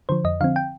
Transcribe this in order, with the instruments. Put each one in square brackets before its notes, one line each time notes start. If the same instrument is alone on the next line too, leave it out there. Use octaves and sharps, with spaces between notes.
[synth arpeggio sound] D3 F3 C5
F2 D#5
D3 F3 C4 F5
G5